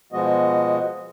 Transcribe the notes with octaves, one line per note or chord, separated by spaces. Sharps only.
B2 F3 G#3 B3 F#4 D#5